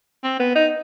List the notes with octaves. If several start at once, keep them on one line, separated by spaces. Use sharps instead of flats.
C4
B3
D#4